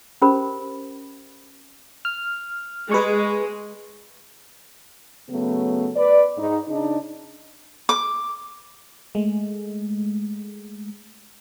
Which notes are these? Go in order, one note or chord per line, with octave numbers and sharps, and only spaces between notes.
C#4 G4 A#4 C5 B5
F6
G#3 B4 C#6
C#3 F#3 A3 B3
B4 D5
G#2 D#4
C#3 D4 D#4
D6
G#3 A3